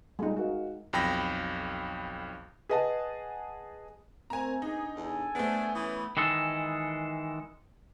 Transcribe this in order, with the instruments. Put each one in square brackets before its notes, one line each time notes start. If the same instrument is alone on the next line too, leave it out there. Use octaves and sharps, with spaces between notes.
[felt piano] A#2 G3 A4 [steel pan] G#3 D#4
[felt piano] F#4 A#4 F5
[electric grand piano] B1 F2 G5 B5 A#6
[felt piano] G#4 B4 D#5 F#5 A5
[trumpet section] A3 [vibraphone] C4 A#4 C5 [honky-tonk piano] G#5 A#5
[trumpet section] B3 G#4 [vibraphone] D4 [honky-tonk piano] D#4
[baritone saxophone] E2 [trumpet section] A4 G#5
[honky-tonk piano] A3 B3 [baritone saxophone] D4 [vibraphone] G#4 C5
[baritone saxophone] E3 [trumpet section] C#4 D#6 [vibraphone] B5
[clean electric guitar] D#3 E3 G#3 A4